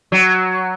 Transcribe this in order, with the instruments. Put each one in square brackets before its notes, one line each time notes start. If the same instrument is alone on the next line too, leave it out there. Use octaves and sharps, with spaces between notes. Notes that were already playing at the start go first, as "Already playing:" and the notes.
[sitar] F#3